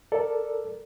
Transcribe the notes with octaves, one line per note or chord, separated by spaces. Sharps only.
A4 A#4 D5